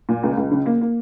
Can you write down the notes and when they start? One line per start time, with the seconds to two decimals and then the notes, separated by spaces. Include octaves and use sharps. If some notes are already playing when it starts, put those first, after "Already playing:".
0.09 A#2
0.23 C#2
0.38 C#2
0.51 C#3
0.66 A#3
0.81 A#3